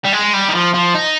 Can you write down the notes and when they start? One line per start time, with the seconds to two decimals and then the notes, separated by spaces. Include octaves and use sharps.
0.05 G3
0.13 G#3
0.33 G3
0.49 D#3
0.55 F3
0.74 F3
0.94 D#4